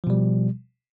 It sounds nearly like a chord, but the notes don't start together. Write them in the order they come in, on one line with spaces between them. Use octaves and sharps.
F3 B2 G3